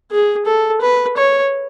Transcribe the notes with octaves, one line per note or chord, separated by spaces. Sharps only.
G#4
A4
B4
C#5